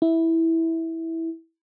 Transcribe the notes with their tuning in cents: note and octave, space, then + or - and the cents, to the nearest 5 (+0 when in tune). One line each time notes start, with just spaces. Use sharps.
E4 -10